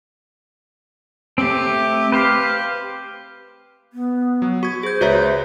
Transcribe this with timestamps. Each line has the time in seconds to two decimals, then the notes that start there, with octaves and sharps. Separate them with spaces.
1.38 A3 C4 G4
2.12 G4 B4 C5 F5
3.93 B3
4.42 F#3
4.63 F#4 C#6 G#6
4.83 G#4 C5 G6
5.01 C#2 F#4 B4 C#5 E5 A#5